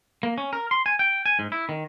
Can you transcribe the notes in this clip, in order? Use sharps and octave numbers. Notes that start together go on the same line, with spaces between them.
A#3
C#4
A#4
C6
G#5
G5
G#5
G#2
E4
D#3